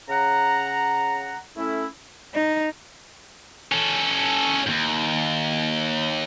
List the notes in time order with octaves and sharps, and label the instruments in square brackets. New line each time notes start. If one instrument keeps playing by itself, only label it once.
[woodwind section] C#3 F#5 A#5
A3 C#4 E4
[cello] D#4
[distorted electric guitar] C#4 A4
D#2 G#2